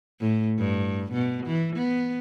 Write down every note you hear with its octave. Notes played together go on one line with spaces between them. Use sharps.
A2
G2
B2
E3
B3